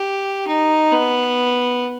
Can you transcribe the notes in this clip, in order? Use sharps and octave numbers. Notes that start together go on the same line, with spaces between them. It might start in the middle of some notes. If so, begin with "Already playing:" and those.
Already playing: G4
D#4
B3